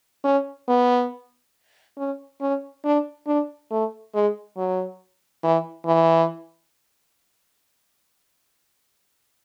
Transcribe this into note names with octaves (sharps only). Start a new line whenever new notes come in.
C#4
B3
C#4
C#4
D4
D4
A3
G#3
F#3
E3
E3